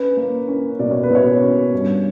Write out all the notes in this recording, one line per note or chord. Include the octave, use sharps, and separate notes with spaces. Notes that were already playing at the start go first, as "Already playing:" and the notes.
Already playing: C#4 B4
A#3
C#4
B2 D5
C#5
B4
B2 C#5
C#4
G2